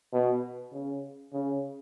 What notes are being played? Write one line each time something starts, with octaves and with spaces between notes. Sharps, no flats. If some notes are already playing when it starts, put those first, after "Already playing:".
B2
C#3
C#3